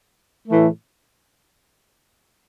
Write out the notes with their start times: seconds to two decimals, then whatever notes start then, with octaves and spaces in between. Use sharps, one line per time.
0.48 A2 E3 A3